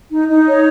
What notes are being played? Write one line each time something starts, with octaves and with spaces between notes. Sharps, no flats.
D#4
D#4
C#5